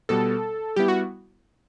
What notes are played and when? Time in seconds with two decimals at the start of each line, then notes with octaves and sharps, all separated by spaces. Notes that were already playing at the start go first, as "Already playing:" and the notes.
0.09 B2 G3 B3 A4
0.76 G3 B3 E4 G4
0.88 F#4